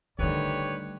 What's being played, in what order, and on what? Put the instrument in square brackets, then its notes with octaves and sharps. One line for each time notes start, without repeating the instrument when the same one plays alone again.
[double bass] D3 D#3 [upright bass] G3 A3 [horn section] G4 B4 C#5